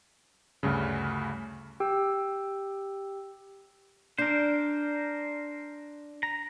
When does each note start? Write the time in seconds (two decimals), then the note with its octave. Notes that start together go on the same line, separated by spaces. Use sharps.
0.63 D2 G2 C#3
1.80 G4 G5 E6
4.18 D4 A#4 C5
6.23 A#5